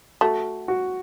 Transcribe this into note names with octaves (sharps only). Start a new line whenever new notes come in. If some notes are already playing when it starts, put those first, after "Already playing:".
A3 F#4
F#4